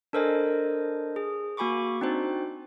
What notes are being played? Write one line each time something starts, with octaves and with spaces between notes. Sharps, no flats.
D4 A4 A#4 C5 D#5 G#5
G#4
A#3 F#4 G#5 B5 C#6 D6
C4 D4 D#4 F#4 C5